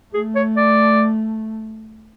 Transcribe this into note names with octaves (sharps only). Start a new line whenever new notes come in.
A3 G#4
C#5
D5